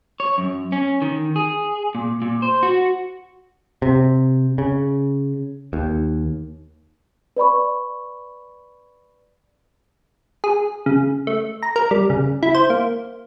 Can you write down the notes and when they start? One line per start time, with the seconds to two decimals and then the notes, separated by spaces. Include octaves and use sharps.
0.20 C#5
0.38 F#2
0.72 C#4
1.02 D#3
1.36 G#4
1.95 A#2
2.22 A#2
2.42 C5
2.63 F#4
3.82 C3
4.58 C#3
5.73 D#2
7.37 B4 D5 B5 C#6
10.44 G#4
10.86 C#3
11.27 A3
11.63 A#5
11.76 A#4
11.91 G3
12.10 C#3
12.43 E4
12.55 C5
12.70 A#3